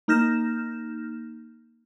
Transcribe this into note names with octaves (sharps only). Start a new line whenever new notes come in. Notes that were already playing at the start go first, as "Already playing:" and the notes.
A#3 D#4 F6 G6 A#6 E7